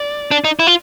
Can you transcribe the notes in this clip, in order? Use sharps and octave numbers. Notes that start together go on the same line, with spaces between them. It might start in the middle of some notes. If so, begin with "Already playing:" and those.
Already playing: D5
D4
D#4
E4
F4